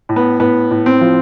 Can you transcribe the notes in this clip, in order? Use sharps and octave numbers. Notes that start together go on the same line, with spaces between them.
A2
B3
A2 B3
A2
C4
F3